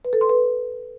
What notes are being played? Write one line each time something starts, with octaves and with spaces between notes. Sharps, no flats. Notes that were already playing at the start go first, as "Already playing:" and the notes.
B4
A4
C6
B4